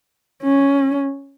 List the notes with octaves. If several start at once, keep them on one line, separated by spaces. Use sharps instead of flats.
C#4